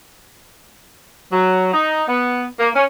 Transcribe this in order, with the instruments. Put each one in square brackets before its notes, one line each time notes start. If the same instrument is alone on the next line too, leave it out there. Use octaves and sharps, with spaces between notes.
[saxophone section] F#3
D#4
B3
A#3
C#4